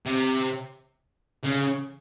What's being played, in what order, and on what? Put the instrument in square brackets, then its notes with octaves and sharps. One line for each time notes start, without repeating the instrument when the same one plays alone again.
[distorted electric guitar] C3
C#3